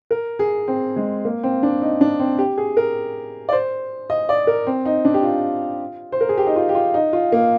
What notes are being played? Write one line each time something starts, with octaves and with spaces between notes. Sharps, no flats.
A#4
G#4
C4
G#3
A#3
C4
D4
D#4
D4
C4
G4
G#4
A#4
D5
C5
D#5
D5
A#4
C4
D#4
D4
G4
F4
C5
A#4
G#4
G4
D#4
F4
G4
F4
D#4
F4
A#3